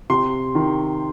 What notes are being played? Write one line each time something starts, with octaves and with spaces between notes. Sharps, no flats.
C3 C6
D#3